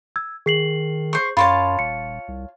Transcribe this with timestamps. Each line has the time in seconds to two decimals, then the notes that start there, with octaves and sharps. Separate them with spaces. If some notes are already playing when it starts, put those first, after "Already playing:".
0.16 E6 G#6
0.46 D#3 G#4 C7 F#7
1.13 C5 C#6
1.37 F#2 F4 C#5 A5 B5 C6
1.79 D#1 C#7
2.28 C2